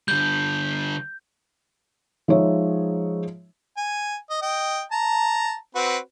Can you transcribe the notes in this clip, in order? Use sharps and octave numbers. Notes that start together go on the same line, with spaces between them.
D3 G3 G6
F3 G#3 D#4 C#5 E5
G#5
D#5
D#5 G5
A5 A#5
C4 F#4 B4